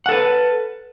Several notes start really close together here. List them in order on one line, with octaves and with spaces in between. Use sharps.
F#5 A4 B4